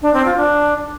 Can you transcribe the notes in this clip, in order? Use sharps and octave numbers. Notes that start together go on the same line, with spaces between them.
D4
C4
F4
D4